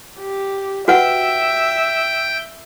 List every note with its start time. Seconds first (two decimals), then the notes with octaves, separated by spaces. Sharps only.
0.20 G4
0.88 F#4 B4 E5 F#5 G5